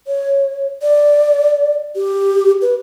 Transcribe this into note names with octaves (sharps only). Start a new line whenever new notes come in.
C#5
D5
G4
B4